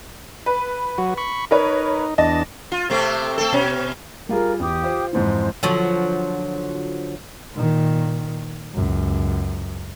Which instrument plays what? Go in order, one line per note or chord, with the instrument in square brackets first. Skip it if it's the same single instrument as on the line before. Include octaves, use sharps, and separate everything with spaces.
[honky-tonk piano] B4
[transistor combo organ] F#3 F#4
B5 C#6
[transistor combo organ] D#4 [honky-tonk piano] A#4 B4 C#5
[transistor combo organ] E2 D4 A5 [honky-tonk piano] D#5
[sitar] F4
C3 A3 C4
A3 C4 A4
B2 C#4
[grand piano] G3 F4 G#4 [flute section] A#4
[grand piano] E2 [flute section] G4 D#6
[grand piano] F4 C5
[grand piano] F2 G#2 E3 [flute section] C5
[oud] D3 F3 F#3
[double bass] A#2 D#3
C#2 F#2